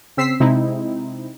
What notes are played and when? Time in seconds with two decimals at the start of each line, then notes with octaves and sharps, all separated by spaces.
0.17 C#3 C4 E6 B6 C7
0.40 C3 G#3 C4 D#4 E4